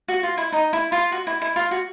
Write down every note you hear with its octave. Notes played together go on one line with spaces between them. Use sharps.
F#4
F4
E4
D#4
E4
F4
F#4
E4
E4
F4
F#4